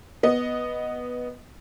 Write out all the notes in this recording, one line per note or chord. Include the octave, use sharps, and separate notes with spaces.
B3 D#5